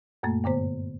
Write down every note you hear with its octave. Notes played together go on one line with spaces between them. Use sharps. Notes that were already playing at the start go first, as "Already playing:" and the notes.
F#2 A#2 A3 A#3
G2 D3 B3 C5